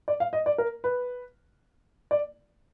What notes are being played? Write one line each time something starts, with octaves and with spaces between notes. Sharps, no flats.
D5
F5
D#5
D5
A#4
B4
D5